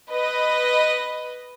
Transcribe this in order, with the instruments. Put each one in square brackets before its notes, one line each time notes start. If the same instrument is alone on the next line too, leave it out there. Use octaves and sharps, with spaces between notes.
[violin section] B4 D#5